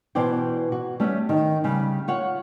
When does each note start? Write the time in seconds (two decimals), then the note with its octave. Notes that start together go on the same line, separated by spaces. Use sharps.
0.15 B2 E3 C5 D5 G5
0.72 F#4
1.00 G3 A3 C#4
1.29 D#3
1.64 C#3 G3
2.08 F4 C#5 F#5